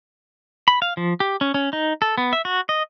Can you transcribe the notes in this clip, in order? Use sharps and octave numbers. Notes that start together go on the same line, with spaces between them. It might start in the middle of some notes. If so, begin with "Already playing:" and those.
B5
F5
F3
G4
C#4
C#4
D#4
A4
B3
E5
F#4
D#5